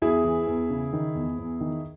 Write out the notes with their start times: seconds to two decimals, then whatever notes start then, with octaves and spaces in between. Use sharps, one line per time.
0.02 E2 E4 G#4
0.24 E3
0.47 E2
0.70 C#3
0.93 D#3
1.15 E2
1.38 E2
1.61 D#3